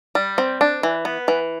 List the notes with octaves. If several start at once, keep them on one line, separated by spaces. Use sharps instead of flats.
G3
C4
D4
E3
B3
E3